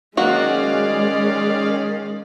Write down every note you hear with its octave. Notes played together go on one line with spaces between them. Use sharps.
D#3 F#3 G#3 A#3 C#4 F#4 D5 F5